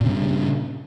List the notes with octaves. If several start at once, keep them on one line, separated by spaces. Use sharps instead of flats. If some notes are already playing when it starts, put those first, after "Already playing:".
G2 A#2 C#3